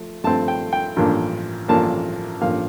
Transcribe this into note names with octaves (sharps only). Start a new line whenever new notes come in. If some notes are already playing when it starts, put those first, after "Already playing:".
Already playing: F3 A3
G2 F3 A3 C4 A5
G5
G5
A1 G2 F3 A#3 D4
A1 G2 F3 A#3 D4 A5
A1 G2 F3 A#3 F5